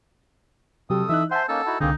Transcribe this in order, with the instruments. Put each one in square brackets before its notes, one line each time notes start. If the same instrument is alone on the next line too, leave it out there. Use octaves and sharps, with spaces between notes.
[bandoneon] F2 A4 D#6 [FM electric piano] C3 F#3 G4
[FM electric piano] E3 D#4 F#6 [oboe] E5
[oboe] C5 [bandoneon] E5 G#5 C6 [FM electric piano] F#5 A5
[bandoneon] A#3 C#4 D#4 [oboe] A4
[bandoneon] D#4 E4 F#4
[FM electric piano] C2 D3 [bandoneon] A#3 C4 G#4 [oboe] D#4